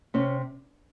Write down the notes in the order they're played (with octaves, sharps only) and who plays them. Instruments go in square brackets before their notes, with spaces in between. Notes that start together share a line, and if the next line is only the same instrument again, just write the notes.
[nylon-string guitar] C3 C#4